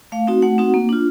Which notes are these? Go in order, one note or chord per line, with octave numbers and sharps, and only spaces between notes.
A3 F5
C4 D#4 F#4
A3 F#5
C4 D#4 F#4
A#3
D4 F4